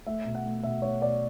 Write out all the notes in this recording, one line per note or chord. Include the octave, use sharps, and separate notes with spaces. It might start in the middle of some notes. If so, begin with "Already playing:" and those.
A3 E5
B2
F#5
A3
B2 E5
A3 C#5
B2 D5